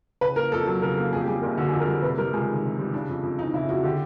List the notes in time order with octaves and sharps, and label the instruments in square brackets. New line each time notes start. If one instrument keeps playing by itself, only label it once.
[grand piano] C#3 [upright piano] B4
[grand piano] A#3 [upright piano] A#4
[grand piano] F2 [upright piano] A4
[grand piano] F#3 [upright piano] A4
[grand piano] C#3 [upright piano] A#4
[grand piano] A#3 [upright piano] A4
[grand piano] F2 [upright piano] G#4
[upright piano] G4
[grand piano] G3 [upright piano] G#4
[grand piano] F#1 [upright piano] A#4
[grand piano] D3 [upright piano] F#4
[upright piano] G#4
[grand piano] F2
[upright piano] A#4
[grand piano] G3
[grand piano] C3 [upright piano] B4
[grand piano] G3 [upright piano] A#4
[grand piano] C#2 [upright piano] G#4
[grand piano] D#3
C3
G3
[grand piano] C#3 [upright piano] D4
[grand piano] F2
F2
[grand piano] E3 [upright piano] D#4
[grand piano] C#3 [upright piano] E4
[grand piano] F2 [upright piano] F#4
[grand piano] D3 [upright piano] G4